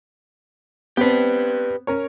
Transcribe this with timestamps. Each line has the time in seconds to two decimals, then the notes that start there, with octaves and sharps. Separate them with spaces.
0.97 B3 C4 G4 B4
1.87 C#4 A#4 C#5